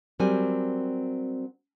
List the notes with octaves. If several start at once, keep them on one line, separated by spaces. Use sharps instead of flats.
F#3 G3 C4 A#4 G#5